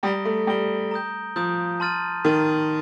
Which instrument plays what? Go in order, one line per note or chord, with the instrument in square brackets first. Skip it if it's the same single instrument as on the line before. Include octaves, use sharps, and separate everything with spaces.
[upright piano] G3 [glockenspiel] A#5 D#6 A#6 D7 G7
[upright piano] A3
[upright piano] G3 [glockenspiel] A#5 D#6 A#6 D7 G7
[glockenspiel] A#5 D#6 G6
[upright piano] F3 [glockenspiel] A#5 D#6 G6
[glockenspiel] A5 C6 F6 A6 D#7
[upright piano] D#3 [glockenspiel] A5 C6 F6 A6 D#7